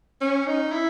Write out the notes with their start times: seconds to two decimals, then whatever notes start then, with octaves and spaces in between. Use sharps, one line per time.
0.21 C#4
0.47 D#4
0.72 E4